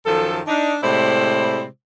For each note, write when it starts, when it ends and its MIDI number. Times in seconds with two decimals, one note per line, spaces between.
0.06 0.40 42
0.06 0.40 51
0.06 0.40 53
0.06 0.40 69
0.47 0.75 62
0.47 0.75 63
0.82 1.65 45
0.82 1.65 48
0.82 1.65 56
0.82 1.65 64
0.82 1.65 72
0.82 1.65 74